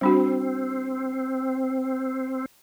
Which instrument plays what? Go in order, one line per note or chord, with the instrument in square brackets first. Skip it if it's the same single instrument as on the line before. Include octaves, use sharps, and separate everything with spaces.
[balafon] G3 D4 F#4 [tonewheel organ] C4